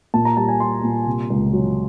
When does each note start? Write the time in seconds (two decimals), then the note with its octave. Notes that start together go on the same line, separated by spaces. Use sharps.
0.14 A#2 A5
0.25 A#5
0.37 G3 A5
0.48 G#5
0.60 G3 C6
0.83 A#2
1.06 C3
1.30 C#2
1.53 F#3